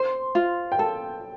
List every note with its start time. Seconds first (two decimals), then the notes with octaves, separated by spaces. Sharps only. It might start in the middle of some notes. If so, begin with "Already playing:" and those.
Already playing: C5 C6
0.35 F4
0.72 G5
0.79 A4 A5